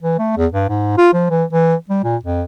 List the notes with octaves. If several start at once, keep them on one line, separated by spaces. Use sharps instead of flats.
E3
A3
E2
G2
G#2
F4
F3
E3
E3
G3
A#2
F2